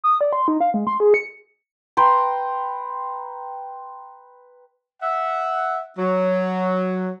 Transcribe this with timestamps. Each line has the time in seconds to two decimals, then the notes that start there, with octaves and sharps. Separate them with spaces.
0.04 D#6
0.21 D5
0.33 C6
0.48 D#4
0.60 F5
0.74 G#3
0.87 C6
1.00 G#4
1.14 C#7
1.97 B4 G5 A#5 C6
5.02 E5 F#5
5.98 F#3